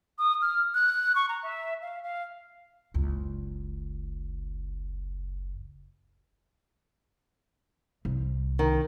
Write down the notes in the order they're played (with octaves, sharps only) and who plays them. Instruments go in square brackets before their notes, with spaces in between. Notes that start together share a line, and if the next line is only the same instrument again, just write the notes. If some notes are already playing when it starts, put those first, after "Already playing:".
[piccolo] D#6
F6
F#6
C#6
A#5
E5
F5
F5
[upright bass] F#1 C#2
C2
[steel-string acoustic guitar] D#3